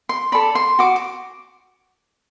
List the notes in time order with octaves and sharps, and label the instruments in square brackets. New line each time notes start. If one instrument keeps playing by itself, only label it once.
[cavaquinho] C6
A4 D5 B5
C6
F#4 D6
D6